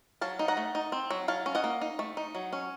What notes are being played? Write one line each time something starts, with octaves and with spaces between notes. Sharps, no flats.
F#3 F5 A5
D#4
F#5 A#5
A3
D#4
C4
F#3
F#3 F5 A5
C#4
D#5 F#5
A#3
D#4
A3
D#4
F#3
C#4